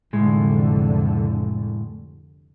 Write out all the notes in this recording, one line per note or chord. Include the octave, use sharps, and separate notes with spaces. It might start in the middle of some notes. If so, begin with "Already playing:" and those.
C2 F2 A2 D3 G#3